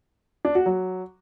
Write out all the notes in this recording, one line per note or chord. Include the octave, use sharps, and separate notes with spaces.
D4
F#4
F#3